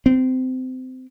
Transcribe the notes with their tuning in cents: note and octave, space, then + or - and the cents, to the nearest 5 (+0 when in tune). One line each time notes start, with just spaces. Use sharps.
C4 -25